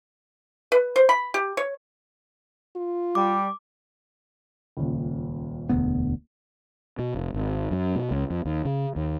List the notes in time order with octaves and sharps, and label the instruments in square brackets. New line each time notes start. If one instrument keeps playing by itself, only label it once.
[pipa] B4
C5
B5
G4
C#5
[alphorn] F4
[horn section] G3 [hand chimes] D6
[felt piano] D#1 C#2
[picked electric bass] E1 D2 B3
[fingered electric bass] B2
F1
G#1
F#2
B2
C#2
F2
D#2
C#3
D#2